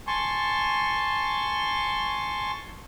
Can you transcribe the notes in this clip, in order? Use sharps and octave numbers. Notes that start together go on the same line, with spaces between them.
G#5 A5 C6 C#6